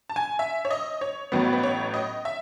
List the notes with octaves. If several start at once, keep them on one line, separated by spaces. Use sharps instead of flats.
A5
G#5
E5
C#5
D#5
C#5
A1 A2 F#3 B3
B4
C#5
D#5
E5